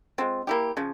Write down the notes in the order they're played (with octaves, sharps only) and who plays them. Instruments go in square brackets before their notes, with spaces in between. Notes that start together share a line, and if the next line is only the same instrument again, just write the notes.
[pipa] G#3 C4 F4
A#3 E4 G4
C#3 F3